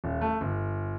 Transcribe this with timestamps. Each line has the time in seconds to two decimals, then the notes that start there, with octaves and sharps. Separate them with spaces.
0.04 D#1
0.21 A3
0.41 G1